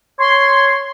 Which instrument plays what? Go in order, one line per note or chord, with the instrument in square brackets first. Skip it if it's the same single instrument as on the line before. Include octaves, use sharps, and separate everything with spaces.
[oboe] C#5 [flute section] C6